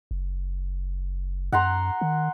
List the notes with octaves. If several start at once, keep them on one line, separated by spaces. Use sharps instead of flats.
F#1
F#2 F#5 A#5 C6
D#3